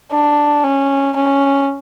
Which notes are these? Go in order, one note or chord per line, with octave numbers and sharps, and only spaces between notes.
D4
C#4
C#4